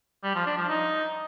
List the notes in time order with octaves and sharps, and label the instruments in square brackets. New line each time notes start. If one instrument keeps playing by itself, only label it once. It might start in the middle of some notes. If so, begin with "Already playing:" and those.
[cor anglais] G3
F3
D4
F3
D#4